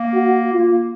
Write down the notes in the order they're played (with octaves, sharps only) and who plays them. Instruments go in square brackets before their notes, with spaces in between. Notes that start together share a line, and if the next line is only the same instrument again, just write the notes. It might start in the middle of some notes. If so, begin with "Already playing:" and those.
Already playing: [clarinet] A#3
[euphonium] F#4
[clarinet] A#3 [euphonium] F4